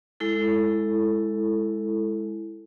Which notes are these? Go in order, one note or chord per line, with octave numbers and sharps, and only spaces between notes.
G#3 E4 A4